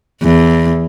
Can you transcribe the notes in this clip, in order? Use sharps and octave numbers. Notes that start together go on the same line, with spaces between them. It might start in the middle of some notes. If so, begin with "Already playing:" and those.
E2